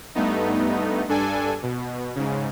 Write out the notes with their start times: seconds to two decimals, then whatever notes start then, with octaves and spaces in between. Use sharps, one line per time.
0.15 G2 A3 B3 D#4
1.08 G2 D4 A4 G#5
1.63 B2
2.16 G#2 C#3